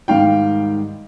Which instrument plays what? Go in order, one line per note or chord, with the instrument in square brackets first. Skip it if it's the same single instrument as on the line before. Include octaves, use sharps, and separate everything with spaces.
[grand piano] G#2 D#3 G3 F5 G5